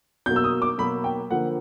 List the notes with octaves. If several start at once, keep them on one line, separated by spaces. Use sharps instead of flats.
B2 F#3 A#3 G6
E6
D#6
D6
B2 F#3 A#3 B5
G5
D3 F3 A#3 F#5